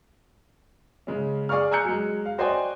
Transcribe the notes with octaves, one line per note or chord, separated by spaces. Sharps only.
C#3 G#3 C#4
G#4 D5 F5 C#6 F6
G#5 A#5 E6 F#6 G6 C#7
F#3 G#3
F5
F#4 C5 D5 D#5 G5 G#5